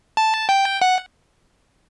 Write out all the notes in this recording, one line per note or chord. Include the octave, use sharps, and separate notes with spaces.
A5
G5
F#5